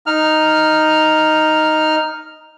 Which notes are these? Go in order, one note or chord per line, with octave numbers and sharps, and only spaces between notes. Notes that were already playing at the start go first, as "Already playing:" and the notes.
D#4 F6